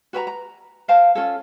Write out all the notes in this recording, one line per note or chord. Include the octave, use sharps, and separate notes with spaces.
F#4 B4 G#5 A#5
A#5
A#4 C5 F5 A5
C#4 F4 A4